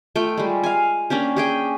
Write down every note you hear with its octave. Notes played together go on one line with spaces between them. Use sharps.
A3 F4 G5
G3 G#3
F5 G#5
A#3 C#4 D4 G4
G4 G#4 G5